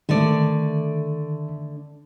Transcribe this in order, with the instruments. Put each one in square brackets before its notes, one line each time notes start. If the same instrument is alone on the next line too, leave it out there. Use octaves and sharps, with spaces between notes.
[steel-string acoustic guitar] D3 A3 D5 [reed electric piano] D#3